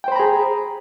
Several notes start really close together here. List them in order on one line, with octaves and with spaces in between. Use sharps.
G5 C5 B5 A#5 G#4